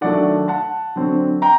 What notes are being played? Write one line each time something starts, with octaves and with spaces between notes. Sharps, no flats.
D#3 F#3 A3 D4 D5 F#5
F#5 A5
D3 F#3 C4
G5 A#5